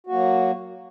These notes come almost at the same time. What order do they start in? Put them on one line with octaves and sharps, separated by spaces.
F#4 A#3 F#3